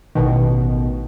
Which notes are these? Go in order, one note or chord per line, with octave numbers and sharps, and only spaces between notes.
A1 B2 D#3